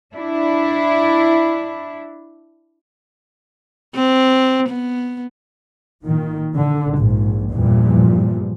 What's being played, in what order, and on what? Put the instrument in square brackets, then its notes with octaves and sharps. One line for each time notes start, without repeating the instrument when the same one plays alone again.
[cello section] D4 E4
[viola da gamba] C4
B3
[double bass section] A#2 D#3
D3
A#1 G#2
E2 G2 A#2 E3 F3 G3